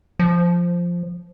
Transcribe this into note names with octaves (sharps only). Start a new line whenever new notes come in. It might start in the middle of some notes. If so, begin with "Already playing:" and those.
F3